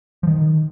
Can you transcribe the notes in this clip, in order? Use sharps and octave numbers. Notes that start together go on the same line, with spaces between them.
F3
D#3